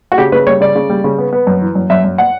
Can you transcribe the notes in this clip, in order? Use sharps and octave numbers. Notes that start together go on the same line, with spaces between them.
F#4
C#3 G4
C#3 B4
G3 C#5
C#3 D5
C#3
G3
C#3
B3
B3
F#2
E3
F#2
F#2 E5
F#2
F#5